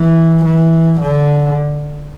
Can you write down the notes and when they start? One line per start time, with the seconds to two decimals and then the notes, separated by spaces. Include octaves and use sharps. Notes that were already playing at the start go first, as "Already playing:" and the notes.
Already playing: E3
0.45 E3
1.01 D3